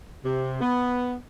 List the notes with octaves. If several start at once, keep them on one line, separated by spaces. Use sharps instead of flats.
C3
B3